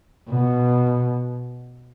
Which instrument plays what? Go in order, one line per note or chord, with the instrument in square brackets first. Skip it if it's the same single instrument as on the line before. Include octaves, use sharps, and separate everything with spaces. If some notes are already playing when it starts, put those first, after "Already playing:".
[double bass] B2